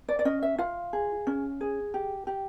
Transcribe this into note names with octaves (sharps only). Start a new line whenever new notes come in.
D5
D5
C#4 D#5
E5
F4 F5
G#4
C#4
G#4
G4
G4